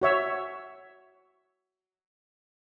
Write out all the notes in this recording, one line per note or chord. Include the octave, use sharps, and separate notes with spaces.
F#4 C#5 E5